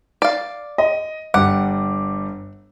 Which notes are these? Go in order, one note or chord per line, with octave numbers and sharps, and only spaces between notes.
D5 F5
D#5
G1 G3 F#5 D6